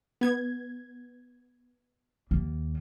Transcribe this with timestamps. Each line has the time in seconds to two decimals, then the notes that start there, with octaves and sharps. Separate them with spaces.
0.21 B3 G#6
2.31 D#2